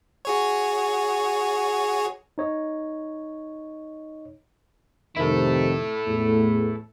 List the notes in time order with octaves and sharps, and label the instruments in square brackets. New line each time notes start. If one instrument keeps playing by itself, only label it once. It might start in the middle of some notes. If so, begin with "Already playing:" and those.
[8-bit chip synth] F#4 G#4 C#5
[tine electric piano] D#4 C#5 D#5
[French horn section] F2 C3 D#3 [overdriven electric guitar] E4 A4
[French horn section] E2 A2